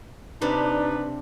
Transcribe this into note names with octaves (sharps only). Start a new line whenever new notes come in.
C3 D4 D#4 G4 B4 D5